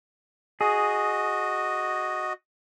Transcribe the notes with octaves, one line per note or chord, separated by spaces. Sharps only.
F#4 G#4 D#5